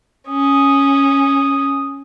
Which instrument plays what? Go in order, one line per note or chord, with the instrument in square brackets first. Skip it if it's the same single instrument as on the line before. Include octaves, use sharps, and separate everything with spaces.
[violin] C#4 [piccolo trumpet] D#6